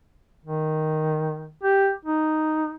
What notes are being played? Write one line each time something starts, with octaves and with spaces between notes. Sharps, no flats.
D#3
G4
D#4